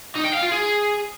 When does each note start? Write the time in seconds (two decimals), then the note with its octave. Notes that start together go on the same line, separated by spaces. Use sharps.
0.15 D#4
0.24 G5
0.33 F5
0.42 F4
0.51 G#4